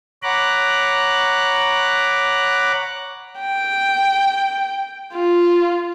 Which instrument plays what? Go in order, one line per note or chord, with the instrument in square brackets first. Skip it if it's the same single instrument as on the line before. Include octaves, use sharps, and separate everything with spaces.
[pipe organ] C#5 F#5 A#5 B5 D6 F#6
[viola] G5
F4